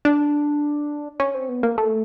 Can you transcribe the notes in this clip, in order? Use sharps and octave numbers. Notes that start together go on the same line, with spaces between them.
D4
C#4
C4
B3
A#3
A3